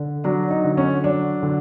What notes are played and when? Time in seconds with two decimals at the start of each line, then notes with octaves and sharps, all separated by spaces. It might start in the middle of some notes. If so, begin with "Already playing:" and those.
Already playing: D3
0.24 F#3 D4
0.50 D#4
0.64 D3
0.77 C#4
1.04 F#3 D4
1.43 D3